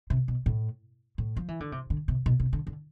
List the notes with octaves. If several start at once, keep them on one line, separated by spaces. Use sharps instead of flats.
C3
B2
A2
A2
F3
E3
D3
C3
D3
C3
B2
C3
D3
D3